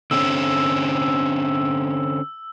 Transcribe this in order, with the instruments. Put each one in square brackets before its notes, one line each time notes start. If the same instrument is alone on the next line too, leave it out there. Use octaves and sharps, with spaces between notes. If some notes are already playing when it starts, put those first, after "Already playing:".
[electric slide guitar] D3 C4 C#4 [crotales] E6